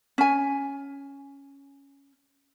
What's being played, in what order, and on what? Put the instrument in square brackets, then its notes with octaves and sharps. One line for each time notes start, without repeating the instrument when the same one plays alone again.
[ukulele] C#4 G#5